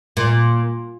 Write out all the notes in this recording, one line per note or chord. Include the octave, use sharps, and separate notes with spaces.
A#2